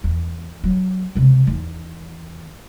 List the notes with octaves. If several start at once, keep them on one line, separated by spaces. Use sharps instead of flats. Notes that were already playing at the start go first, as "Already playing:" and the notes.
E2
F#3
C#2 C3
E2 D#3